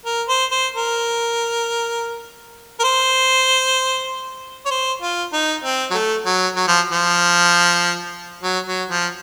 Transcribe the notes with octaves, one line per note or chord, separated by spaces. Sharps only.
A#4
C5
C5
A#4
A#4
C5
C#5
C5
F4
D#4
C4
F#3
A3
F#3
F#3
F3
F3
F#3
F#3
F3